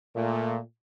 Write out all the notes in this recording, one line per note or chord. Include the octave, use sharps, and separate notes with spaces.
A#2 A3